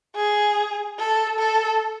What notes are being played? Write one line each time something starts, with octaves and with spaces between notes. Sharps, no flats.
G#4
A4
A4